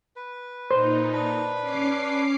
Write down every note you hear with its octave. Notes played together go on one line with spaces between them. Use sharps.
B4
A#2 D#4 C5
D4 B4 B5
C#4 D6 C7